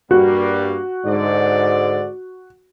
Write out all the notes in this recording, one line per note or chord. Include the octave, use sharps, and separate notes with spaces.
G2 G3 A#3 F#4
G#2 D3 D5